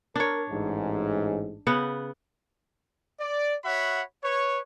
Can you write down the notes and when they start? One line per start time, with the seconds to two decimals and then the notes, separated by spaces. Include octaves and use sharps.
0.16 D4 A#4 C#5
0.50 A1 G#2
1.67 C#3 B3 F#5
3.20 D5
3.65 F#4 C#5 E5 F#5 B5
4.24 B4 C#5